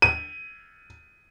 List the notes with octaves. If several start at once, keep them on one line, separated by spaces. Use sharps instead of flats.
D#7